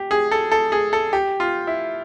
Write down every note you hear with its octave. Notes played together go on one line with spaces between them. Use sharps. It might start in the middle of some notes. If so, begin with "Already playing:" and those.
Already playing: G4
G#4
A4
A4
G#4
A4
G4
F4
E4